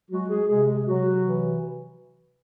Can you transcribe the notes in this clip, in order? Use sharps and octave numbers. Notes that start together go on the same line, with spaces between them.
F#3 G#3 F#4
G#3 G#4
C3 G#3 G#4
G#3 G#4
C3 F#3 F#4
E3